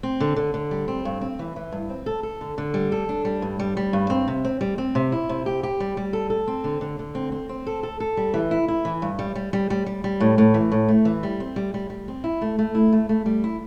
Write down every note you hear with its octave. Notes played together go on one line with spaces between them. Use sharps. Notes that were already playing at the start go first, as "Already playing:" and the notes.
C4
D3
D3
D3
G3
C4
G2
C4
E3
E3
G2
C4
A4
A4
D3
D3
G3
A4
D4
G3
G2
G3
G3
G2
C4
C3
C4
G3
C4
C3
E4
C3
G4
G4
G3
G3
A4
A4
C4
D3
D3
D3
C4
C4
C4
A4
A4
A4
G3
E3
E4
E4
E3
G2
G3
G3
G3
G3
G3
G3
A2
A2
E3
A2
A3
E3
G3
C4
G3
G3
G3
C4
E4
A3
A3
E4
A3
A3
G3
E4